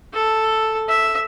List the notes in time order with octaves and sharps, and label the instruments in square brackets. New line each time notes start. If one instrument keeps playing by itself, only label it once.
[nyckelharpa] A4
E5